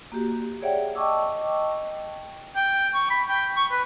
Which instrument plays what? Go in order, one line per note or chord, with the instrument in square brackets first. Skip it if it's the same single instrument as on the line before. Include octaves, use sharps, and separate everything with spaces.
[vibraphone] A#3 F#4 G4
G#4 C#5 D5 E5 F#5 G5
D#5 G5 A5 C#6 D6 E6
[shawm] G5
C#6
B5
G5
C#6
B4